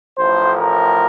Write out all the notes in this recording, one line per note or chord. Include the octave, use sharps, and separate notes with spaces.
A1 A2 F3 C5
A#4